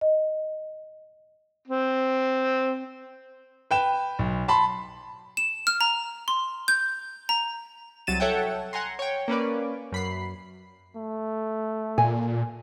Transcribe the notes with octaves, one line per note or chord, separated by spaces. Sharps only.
D#5
C4
B4 G5 E7
B1
A5 B5 C6
E7
F6
A#5
C6
G6
A#5
C2 F#3 A6 D#7 E7
A4 C#5 E5 F#5 G5
F#5 G#5 A#5 C6
C#5 G5
A#3 C#4 B4 D5
F#2 B5 C7
A3
A#2 G#5